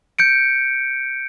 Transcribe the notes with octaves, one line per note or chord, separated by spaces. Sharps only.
G6 C#7 D7